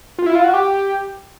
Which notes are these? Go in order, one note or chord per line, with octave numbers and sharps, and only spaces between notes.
F4
E4
F4
F#4
G4